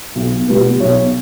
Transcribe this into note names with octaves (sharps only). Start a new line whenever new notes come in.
B1
B2 G3 B3
B1 C#5